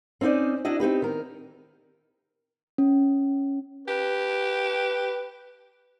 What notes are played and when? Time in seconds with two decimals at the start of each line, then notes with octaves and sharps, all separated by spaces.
0.21 C4 C#4 D#4 C5 D5
0.65 D4 E4 F#4 D#5
0.80 C4 D#4 G4 B4
1.02 D#3 A#4
2.78 C#4
3.88 G4 B4